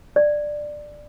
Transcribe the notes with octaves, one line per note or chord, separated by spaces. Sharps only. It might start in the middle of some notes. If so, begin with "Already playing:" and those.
D5